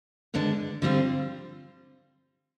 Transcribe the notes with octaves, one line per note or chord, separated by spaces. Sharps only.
D#2 D3 G#3 B3 D4
D3 G3 C4 F4